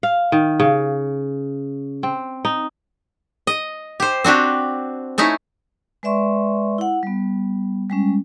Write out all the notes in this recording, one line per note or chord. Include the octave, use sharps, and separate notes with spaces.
F5
D#3
C#3
C4
D#4
D#5
G4 C5
C4 D4 F#4 G4
A3 C#4 D#4 E4
G#3 B4 D5 E5 C6 C#6
E4 F#5
G3 B3
G3 G#3 C#4